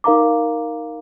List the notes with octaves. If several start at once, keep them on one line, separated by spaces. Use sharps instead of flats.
D#4 A#4 F5 A#5 D6